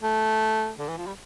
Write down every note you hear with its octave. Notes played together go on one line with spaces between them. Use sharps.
A3
D3
E3
F3
G3